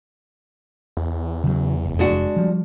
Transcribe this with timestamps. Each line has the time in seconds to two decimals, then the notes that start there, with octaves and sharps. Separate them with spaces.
0.97 E2
1.44 C#3 E3 F#3
1.85 F1
1.99 G#3 D4 F#4
2.37 F3 G3